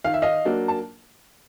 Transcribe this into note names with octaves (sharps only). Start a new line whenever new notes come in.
D#3 F5
E5
D#5 F5
F#3 A#3 D4
A5